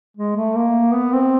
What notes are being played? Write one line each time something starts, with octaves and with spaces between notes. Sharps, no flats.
G#3
A3
A#3
B3
C4